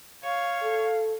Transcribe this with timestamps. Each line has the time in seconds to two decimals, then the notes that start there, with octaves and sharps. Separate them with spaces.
0.23 C#5 F5
0.63 A4